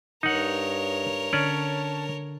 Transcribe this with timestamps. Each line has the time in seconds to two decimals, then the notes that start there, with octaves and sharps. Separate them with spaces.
0.23 G2 D#4 A#4 C#5 F#5
1.33 D3 C#4 D5 A5